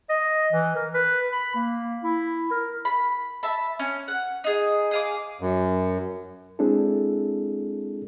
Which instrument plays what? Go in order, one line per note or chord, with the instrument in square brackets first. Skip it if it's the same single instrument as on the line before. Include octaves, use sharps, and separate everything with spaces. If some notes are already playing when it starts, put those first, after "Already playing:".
[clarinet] D#5
E3
A#4
B4
B5
A#3
E4
A#4
[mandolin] B5
E5 A5 B5
C#4
F#5
D#4 G#4
G#4 F5 D6
[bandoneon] F#2
[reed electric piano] G#3 C4 D4 E4 G#4 A4